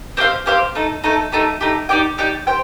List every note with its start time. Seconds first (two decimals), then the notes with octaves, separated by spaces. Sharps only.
0.17 C4 G4 C5 F5
0.46 C4 G4 C5 F5
0.75 A3 D#4 A4
1.04 A3 D#4 A4
1.32 A3 D#4 G4
1.61 A3 D#4 G4
1.89 D#4 G4 D5 G5
2.18 D#4 G4 D5 G5
2.47 G4 C5 G5